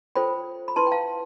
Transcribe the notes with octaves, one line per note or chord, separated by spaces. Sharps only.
F4 A4 C5 G5 B5
B5
E4 B4 A5 C6
G5
F5 A5